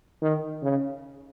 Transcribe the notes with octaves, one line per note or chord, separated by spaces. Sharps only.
D#3
C#3